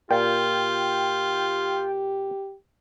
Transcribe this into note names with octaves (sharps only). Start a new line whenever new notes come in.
A#2 F4 G4 G5